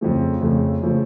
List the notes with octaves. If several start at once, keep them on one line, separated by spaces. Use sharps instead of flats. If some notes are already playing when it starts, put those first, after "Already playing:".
F2 C#3 F3 A3
F2 C#3 F3 A3
C#3 F3 A3